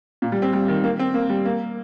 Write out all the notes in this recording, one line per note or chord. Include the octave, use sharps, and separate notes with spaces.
A#2
G3
C4
G3
D#3
A#3
C4
A#3
G3
A#3